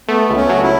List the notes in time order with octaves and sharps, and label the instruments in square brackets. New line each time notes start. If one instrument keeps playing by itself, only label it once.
[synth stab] A3 [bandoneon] B3
[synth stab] C#2
[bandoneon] C#4
[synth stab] F#3
[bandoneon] E4